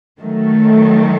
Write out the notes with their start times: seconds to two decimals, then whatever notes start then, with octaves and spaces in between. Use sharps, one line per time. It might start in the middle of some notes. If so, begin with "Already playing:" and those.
0.20 D#3 F#3 A3